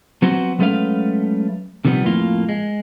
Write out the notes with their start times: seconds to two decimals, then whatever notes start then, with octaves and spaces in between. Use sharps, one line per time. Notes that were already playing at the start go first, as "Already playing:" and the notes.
0.22 F#3 B3 C4 F#4 C5
0.59 F#3 G#3 A3 C#4 B4 F5
1.85 C3 D#3 F3 G3 B3
2.04 F2 A2 A#3 F4
2.49 G#3